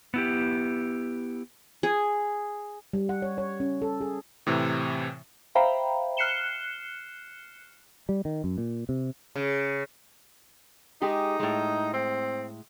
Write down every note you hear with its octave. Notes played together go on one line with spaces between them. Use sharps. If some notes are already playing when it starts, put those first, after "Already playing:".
B3 E4 G4
G#4
G3
F#5
C#5
C#5
C#4
A4
G#4
A2 C3 E3
C5 E5 F5 G5 A#5 B5
F6 F#6 C7 C#7 E7 G7
G3
D#3
F#2
A#2
C3
C#3
G#3 D#4 G4 G#4
A2 G#3
C4